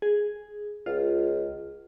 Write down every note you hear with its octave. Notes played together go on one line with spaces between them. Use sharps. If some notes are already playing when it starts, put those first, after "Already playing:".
G#4
C#2 F4